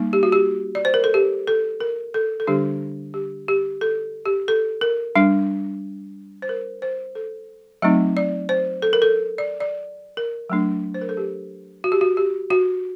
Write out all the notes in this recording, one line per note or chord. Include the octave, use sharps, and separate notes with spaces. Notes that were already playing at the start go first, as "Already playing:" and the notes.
Already playing: G3 A#3 D#4
G4
F#4
G4
D5
C5
A#4
A4
G4
A4
A#4
A4
A4
D3 G3 D4 G4
G4
G4
A4
G4
A4
A#4
G3 D4
C5
A#4
C5
A4
F#3 A3 C4 D#4 D#5
D5
C5
A4
A#4
A4
D5
D5
A#4
F#3 A3 D4
C5
A#4
A4
G4
F#4
G4
F#4
G4
F#4